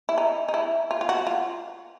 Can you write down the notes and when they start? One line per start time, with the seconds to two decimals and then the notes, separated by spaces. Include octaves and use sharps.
0.09 E4
0.18 D#4
0.48 D#4
0.54 E4
0.91 F4
1.01 F4
1.09 F#4
1.27 F4